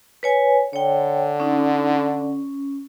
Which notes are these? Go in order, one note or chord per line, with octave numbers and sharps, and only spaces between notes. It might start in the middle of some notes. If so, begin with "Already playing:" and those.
B4 C#5 G#5
D3 C#5 G5
C#4 D#4
C#4